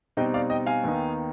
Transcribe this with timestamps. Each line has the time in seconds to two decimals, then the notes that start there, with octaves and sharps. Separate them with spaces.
0.17 B2 G3 C4 D#4 D#5 G5
0.34 D5 F5
0.50 D#5 G5
0.66 F5 G#5
0.84 D#2 D#3 B3 D#4